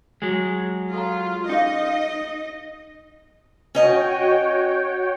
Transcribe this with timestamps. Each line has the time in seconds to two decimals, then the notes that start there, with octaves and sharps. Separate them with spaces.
0.22 F#3 G#3
0.94 F4 A4 A#5
1.49 C#4 D#4 G#4 D#5 F5
3.75 C#4 F#4 C#5 D#5 G5 G#5